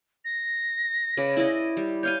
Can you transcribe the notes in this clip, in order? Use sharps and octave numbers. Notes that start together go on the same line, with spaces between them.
A#6
C#3 B4 D5
E4 D5 D#5
G3
C#5 F5 G#5 G6